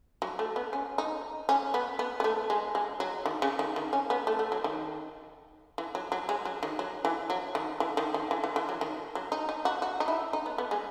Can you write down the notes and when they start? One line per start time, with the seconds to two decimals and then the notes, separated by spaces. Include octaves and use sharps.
0.22 F#3
0.39 A3
0.56 B3
0.73 C#4
0.98 D#4
1.49 C#4
1.74 B3
1.99 B3
2.20 B3
2.24 A3
2.50 G#3
2.75 G#3
3.00 F#3
3.26 D#3
3.42 C#3
3.59 D#3
3.76 D#3
3.93 C#4
4.10 B3
4.27 A3
4.39 A3
4.52 F#3
4.64 D#3
5.78 E3
5.95 F#3
6.12 F#3
6.29 G#3
6.45 F#3
6.63 D#3
6.79 F#3
7.05 E3
7.30 F#3
7.55 D#3
7.80 E3
7.97 D#3
8.14 D#3
8.31 E3
8.44 E3
8.56 E3
8.69 F#3
8.81 D#3
9.15 F#3
9.32 D#4
9.49 D#4
9.65 F#4
9.82 F#4
10.00 D#4
10.08 E4
10.33 D#4
10.46 B3
10.58 B3
10.71 G#3